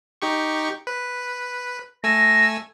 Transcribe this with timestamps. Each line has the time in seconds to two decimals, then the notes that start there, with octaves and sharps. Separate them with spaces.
0.22 D#4 G4 C#6
0.87 B4
2.04 A3 G#5 E6 A#6